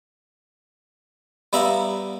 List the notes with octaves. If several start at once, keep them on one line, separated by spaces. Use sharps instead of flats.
G3 B3 E4 E5 F5 A#5